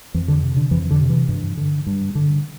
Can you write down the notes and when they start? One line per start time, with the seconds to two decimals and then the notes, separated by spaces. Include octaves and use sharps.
0.14 F2 E3
0.28 D3
0.43 C3
0.57 D3
0.71 F2 E3
0.91 D3
1.01 C3
1.10 E3
1.29 G2
1.57 D3
1.86 G2
2.15 D3